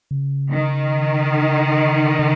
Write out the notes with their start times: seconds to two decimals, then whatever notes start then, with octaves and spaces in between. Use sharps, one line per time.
0.11 C#3
0.52 D#3
2.19 C#3